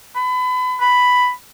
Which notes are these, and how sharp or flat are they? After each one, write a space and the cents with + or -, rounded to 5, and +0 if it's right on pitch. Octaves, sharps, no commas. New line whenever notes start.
B5 +30
B5 +5